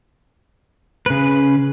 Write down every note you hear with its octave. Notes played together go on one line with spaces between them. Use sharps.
C#3 B4